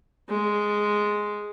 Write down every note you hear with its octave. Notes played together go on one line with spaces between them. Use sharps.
G#3